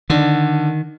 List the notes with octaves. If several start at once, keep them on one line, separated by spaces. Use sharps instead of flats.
D3 D#3